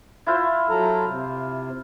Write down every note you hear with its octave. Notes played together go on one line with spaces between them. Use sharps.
E4 F4 C5
F#3 A4 A#5
C3